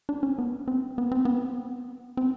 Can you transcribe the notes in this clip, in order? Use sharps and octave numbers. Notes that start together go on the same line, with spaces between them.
D4
C#4
B3
C4
B3
C4
B3
C4